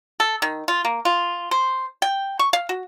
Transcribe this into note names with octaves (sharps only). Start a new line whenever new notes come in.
A4
D#3
F4
A#3
F4
C5
G5
C#6
F5
F#4